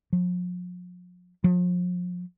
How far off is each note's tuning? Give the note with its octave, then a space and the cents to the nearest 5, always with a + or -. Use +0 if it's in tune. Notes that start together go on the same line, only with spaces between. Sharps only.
F3 +45
F3 +35